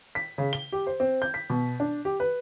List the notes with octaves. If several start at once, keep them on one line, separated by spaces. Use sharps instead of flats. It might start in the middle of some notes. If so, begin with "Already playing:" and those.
B6
C#3
G7
G4
C5
C4
G6
B6
B2
D4
G4
B4